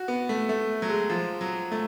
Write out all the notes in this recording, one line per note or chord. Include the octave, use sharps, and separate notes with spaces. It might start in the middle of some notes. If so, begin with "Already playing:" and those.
Already playing: F#4
B3
A3
A3
F#3
G#3
F3
F#3
A3